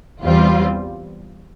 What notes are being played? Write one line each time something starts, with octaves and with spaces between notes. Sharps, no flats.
E2 E3 G3 C4 F4